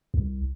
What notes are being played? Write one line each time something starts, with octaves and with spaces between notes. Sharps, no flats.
C2